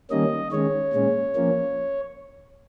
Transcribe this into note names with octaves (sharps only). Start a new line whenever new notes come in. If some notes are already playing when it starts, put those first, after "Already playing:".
D#3 G3 A#3 C#4 D#5
D#3 G#3 C#4 C#5
A#2 G#3 C#4
F3 A#3 C#4